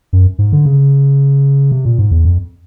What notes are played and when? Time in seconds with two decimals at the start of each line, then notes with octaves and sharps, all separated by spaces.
0.13 F#2
0.39 G#2
0.52 D3
0.65 C#3
1.72 C3
1.85 A#2
1.99 G#2
2.11 E2
2.25 F2